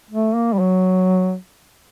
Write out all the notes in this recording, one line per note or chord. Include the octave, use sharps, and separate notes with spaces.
A3
A#3
G3
F#3